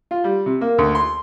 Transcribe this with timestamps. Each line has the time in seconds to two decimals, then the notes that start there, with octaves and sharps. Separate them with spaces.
0.11 F4
0.24 G3
0.46 C3
0.61 A#3
0.78 D2
0.95 C6